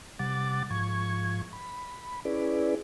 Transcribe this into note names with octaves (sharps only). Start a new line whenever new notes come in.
C3 G3 F#5 D6 A6
G#2 F3 C#6 G#6
B5
C#4 E4 G#4 B4 D5